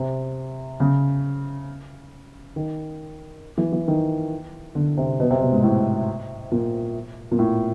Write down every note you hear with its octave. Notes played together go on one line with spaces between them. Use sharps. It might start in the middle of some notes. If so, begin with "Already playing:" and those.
Already playing: C3
C#3
D#3
E3
E3
D#3
D3
C3
B2
C3
B2
G#2
A2
A#2
A#2
A2